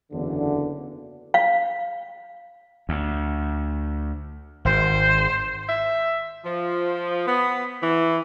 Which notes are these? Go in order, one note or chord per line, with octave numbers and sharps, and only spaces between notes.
F#1 E2 D3
F5
D2
G#1 C5
E5
F3
B3
E3